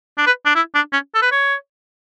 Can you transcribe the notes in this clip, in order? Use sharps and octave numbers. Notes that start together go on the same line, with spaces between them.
D4
B4
D4
E4
D4
C#4
A4
B4
C#5